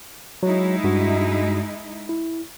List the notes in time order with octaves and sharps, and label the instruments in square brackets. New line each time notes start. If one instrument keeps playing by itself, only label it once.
[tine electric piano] F#3 [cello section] G#3 D#4 E4
[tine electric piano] G2 F#4
E4